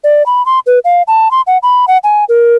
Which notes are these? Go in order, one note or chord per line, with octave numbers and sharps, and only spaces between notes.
D5
B5
C6
B4
F5
A5
C6
F#5
B5
F#5
G#5
A#4